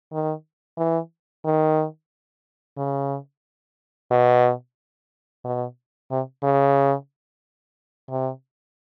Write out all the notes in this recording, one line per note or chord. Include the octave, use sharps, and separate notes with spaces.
D#3
E3
D#3
C#3
B2
B2
C3
C#3
C3